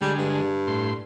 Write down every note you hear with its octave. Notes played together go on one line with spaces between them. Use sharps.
D3 G3 G#3
G2
A2 C6